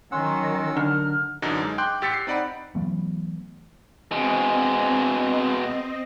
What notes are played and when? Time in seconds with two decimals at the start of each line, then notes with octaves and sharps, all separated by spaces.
0.12 D#3 F#3 C#4 F#5 C6 E6
0.77 D3 A#4 F6
1.42 F#2 D3 E3 F#3 D4 D#4
1.61 G#3 D#4
1.78 G5 C6 D6 F#6 G6
2.02 A1 G4 E6 A6 B6 C#7
2.14 C7
2.27 C4 D#4 D5 F#5 B5
2.75 E3 F#3 A3 B3
4.12 B2 G#3 C4 D#5